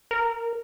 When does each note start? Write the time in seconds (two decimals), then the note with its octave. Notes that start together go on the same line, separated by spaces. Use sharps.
0.11 A#4